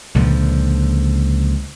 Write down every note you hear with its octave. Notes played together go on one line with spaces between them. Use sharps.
C#2 A#2 D3 F3